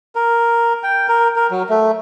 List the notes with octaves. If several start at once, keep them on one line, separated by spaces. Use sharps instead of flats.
A#4
G5
A#4
A#4
F#3
A3